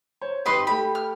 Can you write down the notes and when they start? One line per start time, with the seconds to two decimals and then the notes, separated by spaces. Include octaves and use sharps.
0.22 C5 C#5
0.46 G#1 G4 B4 D#5 B5 C6
0.67 A3 G4 B5
0.95 F6